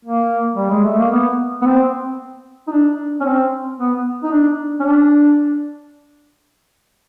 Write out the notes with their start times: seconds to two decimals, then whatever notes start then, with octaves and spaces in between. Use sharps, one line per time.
0.05 A#3
0.56 G3
0.70 G#3
0.84 A3
0.98 A#3
1.12 B3
1.62 B3
1.66 C4
2.68 D#4
2.72 D4
3.21 C#4
3.25 C4
3.79 B3
4.23 D#4
4.32 D4
4.80 C#4
4.85 D4